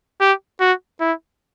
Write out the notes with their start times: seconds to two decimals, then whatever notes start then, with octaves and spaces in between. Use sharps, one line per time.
0.21 G4
0.61 F#4
1.00 E4